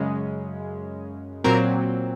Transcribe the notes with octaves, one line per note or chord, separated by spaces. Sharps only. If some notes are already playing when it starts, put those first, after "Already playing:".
Already playing: F#2 C#3 G#3 C#4
A#2 F#3 C4 A#4